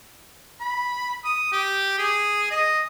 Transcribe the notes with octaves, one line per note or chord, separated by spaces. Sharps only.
B5
D#6
G4
G#4
D#5